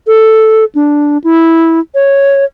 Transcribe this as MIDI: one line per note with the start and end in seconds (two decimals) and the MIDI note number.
0.07 0.65 69
0.75 1.18 62
1.24 1.80 64
1.95 2.45 73